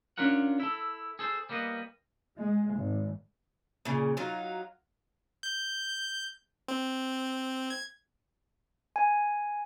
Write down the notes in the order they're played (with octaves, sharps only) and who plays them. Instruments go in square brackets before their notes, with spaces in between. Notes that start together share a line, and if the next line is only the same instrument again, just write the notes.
[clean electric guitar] C#4 D4 F4 A#4 F#5
E4 A4
G#4 A4 C5
G3 A#3 B3 D#5
[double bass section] G#3
G#1
[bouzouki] A#2 C#3
F#3 D#4 F4
[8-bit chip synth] G6
C4
G#6
[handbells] G#5